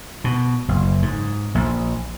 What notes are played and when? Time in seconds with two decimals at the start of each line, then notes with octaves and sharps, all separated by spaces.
0.24 B2
0.68 F#1
1.02 G#2
1.55 A#1